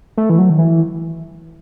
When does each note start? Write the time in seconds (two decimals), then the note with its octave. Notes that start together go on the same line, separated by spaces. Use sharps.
0.17 A3
0.30 E3
0.38 F#3
0.50 D#3
0.59 E3